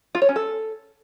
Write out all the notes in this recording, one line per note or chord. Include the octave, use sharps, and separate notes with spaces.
F4
C#5
C#4
A4